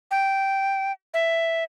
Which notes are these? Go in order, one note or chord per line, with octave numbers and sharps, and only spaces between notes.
G5
E5